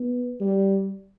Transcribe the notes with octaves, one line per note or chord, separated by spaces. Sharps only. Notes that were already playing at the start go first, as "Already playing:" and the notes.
Already playing: B3
G3